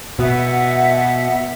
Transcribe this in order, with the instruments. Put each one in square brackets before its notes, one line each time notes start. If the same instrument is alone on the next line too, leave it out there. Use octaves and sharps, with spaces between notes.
[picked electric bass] B2 [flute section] E5 F#5